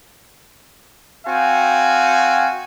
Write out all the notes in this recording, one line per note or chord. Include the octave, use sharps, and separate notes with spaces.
C4 F#4 F5 G5 G#5